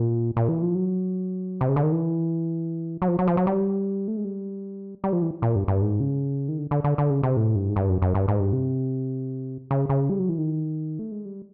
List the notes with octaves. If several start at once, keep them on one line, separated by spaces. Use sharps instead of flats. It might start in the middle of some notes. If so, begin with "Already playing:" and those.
Already playing: A#2
A#2
E3
F3
F#3
C3
C#3
D3
D#3
E3
F#3
F3
F#3
F3
F#3
G3
A3
G#3
G3
G3
F3
E3
A#2
G2
G2
G#2
C#3
D#3
D3
D3
D3
D3
C#3
C3
A2
G2
G#2
G2
F#2
F#2
G2
G#2
G2
C3
C#3
C#3
G3
F#3
E3
D#3
A3
G#3
G3